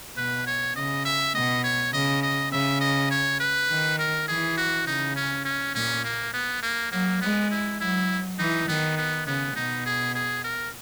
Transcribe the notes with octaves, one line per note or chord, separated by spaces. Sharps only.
B2 B4
C#5
C#3 D#5
E5
B2 D#5
C#5
C#3 D#5
D#5
C#3 E5
D#5
C#5
B4
D#3
A#4
E3 G#4
F#4
C#3 D#4
C#4
C#4
A#2 C#4
A#3
B3
A#3
F#3 A#3
G#3 B3
E4
F#3 E4
E3 D#4
D#3 B3
B3
C#3 B3
B2 D#4
G#4
G#4
A#4